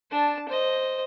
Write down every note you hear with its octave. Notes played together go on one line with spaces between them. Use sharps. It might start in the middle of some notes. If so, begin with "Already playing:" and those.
D4 A5
C5 D#5